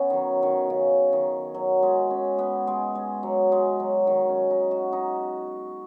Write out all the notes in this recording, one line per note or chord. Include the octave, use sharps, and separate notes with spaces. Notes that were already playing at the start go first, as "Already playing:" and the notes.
Already playing: B3 C#4
D#3 F#3
D#3
C#3
D#3
F#3
G#3
C#4
B3
G#3
G#3
F#3
G#3
F#3
D#3
C#4
D#4
F#4
D#4